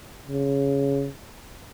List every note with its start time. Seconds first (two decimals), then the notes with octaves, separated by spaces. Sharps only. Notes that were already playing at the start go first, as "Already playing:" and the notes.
0.27 C#3